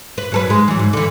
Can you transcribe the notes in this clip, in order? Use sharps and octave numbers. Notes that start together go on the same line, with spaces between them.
B4
F#3 A4 B4
G#2 G#3
E3 F#3
G#2
D3 E3